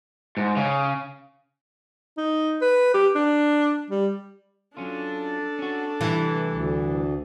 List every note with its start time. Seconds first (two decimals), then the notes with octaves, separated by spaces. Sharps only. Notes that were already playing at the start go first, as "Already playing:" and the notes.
0.37 G#2
0.56 C#3
2.17 D#4
2.61 B4
2.94 G4
3.15 D4
3.90 G3
4.77 F#3 C#4 D4 F4 A4
5.59 C#4 F#4
6.01 C2 E3 A3 G4
6.51 D2